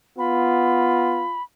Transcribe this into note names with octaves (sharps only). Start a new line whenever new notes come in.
B3 F4 B5